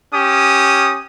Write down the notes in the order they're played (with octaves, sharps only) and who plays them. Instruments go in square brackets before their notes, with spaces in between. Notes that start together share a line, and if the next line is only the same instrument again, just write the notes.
[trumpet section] C#4 G4 D#6